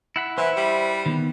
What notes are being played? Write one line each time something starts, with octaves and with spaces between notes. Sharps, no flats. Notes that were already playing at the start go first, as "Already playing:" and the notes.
E4 F#5 B5
E3 C5 E5
G3
D#3 B3